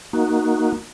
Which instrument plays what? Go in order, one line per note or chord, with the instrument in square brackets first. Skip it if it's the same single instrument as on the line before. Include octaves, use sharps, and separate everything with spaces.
[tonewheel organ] A#3 D#4 F#4